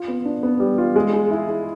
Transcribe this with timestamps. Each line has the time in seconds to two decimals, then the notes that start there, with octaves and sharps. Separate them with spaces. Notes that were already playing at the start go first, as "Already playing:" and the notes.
Already playing: F4
0.08 B3
0.25 D4
0.43 B3
0.60 G3
0.78 F4
0.96 G#3
1.13 G#4
1.31 E4
1.48 G#4